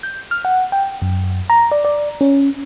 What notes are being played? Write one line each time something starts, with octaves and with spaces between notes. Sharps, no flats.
G6
F6
F#5
G5
F#2
A#5
D5
D5
C#4